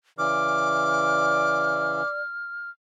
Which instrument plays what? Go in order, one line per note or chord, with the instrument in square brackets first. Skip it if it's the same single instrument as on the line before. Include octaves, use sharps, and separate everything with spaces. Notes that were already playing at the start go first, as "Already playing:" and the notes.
[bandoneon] C#3 E3 [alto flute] D5 [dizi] D6 [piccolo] F6